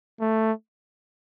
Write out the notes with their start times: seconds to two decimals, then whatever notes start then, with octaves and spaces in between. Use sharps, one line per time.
0.20 A3